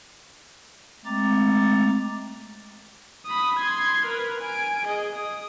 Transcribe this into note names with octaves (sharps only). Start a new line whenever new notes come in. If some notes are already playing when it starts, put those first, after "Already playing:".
G#3 A3 C4 A#5 D6 A6
B5 D#6
C6 G#6
A#4 B4
G#5 D7
G#4 D#5
D#6